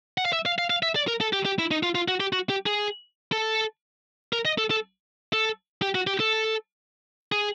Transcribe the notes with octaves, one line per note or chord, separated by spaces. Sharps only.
F#5
F5
E5
F5
F5
F5
E5
D5
A#4
A4
G4
G4
E4
D#4
F4
F4
F#4
G4
F#4
G4
G#4
A4
A#4
D#5
A4
A4
A4
G4
F#4
G4
A4
G#4